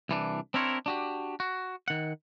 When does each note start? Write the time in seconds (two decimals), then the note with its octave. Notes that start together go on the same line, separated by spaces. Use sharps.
0.09 C2 E3 D4
0.54 C4 D4 E4 A#4 C5 C#5
0.86 D4 F#4 G4
1.40 F#4
1.88 D#3 F#5